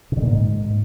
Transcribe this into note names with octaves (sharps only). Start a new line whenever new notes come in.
C3
D3
A#2
G#2